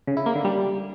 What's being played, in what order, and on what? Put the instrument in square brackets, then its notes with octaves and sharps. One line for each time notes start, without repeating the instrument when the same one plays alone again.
[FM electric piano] C#3
E4
A#3
D3
G3